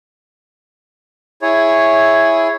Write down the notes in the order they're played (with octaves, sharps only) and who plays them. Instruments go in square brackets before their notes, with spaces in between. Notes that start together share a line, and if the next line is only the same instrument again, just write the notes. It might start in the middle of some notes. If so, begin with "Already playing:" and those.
[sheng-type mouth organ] E4 G#4 C#5